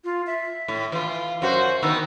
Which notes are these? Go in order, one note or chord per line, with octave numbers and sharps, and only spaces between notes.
F4
E5
A2
E3 F4
F#2 F#4 C5
D#3 B3 D#4 E6